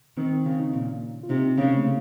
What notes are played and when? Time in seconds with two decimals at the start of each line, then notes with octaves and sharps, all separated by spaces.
0.17 D#3 C4
0.45 C#3 C#4
0.60 D#4
0.73 A#2
1.23 F4
1.29 C3 D#4
1.58 C#3 A#3
1.75 A3